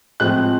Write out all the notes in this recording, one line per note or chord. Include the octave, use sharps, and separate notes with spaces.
A2 F3 G#3 C4 F#6